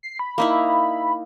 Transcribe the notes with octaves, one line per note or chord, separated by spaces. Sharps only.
C7
B5
A#3 D#4 E4